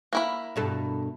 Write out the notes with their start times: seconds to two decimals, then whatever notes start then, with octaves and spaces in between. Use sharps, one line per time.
0.13 A#3 E4 B5
0.56 G2 B2 A4